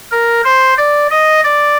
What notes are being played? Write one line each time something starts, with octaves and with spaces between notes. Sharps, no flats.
A#4
C5
D5
D#5
D5